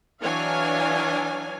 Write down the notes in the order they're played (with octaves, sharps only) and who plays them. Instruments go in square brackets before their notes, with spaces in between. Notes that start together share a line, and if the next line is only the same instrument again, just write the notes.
[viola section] E3 F#3 D4 C#5 F5 G#5